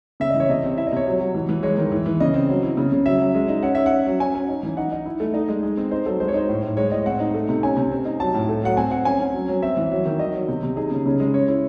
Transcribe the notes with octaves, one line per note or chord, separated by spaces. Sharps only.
C#3 E5
E3 D#5
C#5
C3 D#5
C4
E4 E5
D#5
C3 C#5
F#3
F#3
E3
E3
G#3 C#5
D#3
E3
E3
C#3 D#5
C4
F#3
E4
C#3
C#3
F#3 E5
F#3
G#3
D#4
C#4 F#5
C#4 E5
F#5
C#4
F#3
C#4 G#5
C#4
D#4
E3
D#4 F#5
D#4
E4
A3
D#4 D#5
G#3
G#3
C4
D#4 C5
F#3 A4
G#3 C5
C#5
D#4 C5
A2
A2
G#3 C#5
A2 D#5
C4 F#5
D#4
A3
C3
C#4 G#5
C3
C4
D#4
F#3 A5
A2
A3
F#3 F#5
C4 G#5
C4 F#5
C#4 G#5
C#4
F#3
F#3
C4 E5
E3
F#3
D#3
F#3 D#5
F#3
C3
C3
D#4 G#4
C#3
C#3
G#3
C#4 C#5
E4